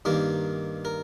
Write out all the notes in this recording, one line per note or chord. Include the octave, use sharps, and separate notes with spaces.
G2 D#3 A#3 A#4
A#4